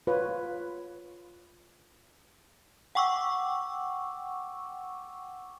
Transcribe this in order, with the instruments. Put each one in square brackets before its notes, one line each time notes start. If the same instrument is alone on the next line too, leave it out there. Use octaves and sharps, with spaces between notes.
[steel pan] F4 B4 C#5
[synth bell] F#5 G5 C#6 D6 E6